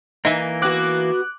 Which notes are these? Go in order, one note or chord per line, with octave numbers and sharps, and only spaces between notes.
E3 A#3 D#4 E5 G#5
B3 F#4 D6 F#6